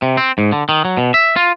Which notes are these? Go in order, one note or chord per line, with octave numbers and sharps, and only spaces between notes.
C3
C4
G#2
D3
D#3
F#3
B2
E5
F4